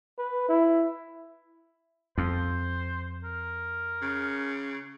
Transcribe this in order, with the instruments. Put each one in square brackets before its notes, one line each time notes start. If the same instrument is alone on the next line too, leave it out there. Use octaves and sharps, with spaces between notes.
[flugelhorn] B4
E4
[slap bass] F2 [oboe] C5
[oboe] A#4
[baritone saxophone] C#3